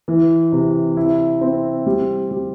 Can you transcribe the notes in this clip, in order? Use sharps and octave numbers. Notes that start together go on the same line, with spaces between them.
E3
C3
E4
C4
G3
G3